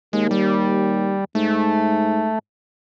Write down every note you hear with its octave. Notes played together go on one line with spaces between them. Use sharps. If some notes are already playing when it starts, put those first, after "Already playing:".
D#2 G#3
G3
G#2 A3